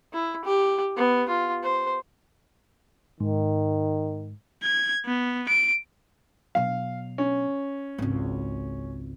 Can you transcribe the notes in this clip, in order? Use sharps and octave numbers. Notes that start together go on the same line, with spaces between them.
E4
G4
B3
F4
C5
G#2 D#3
G#6
B3
D7
B2 F#3 F5
C#4
G#1 C#2